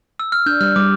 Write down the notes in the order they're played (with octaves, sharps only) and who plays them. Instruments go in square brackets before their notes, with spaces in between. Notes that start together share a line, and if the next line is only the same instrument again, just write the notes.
[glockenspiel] E6
F6
[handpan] D4 [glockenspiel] G6
[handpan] G3 [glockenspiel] F6
[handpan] G3 [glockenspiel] D6